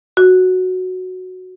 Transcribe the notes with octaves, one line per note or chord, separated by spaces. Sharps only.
F#4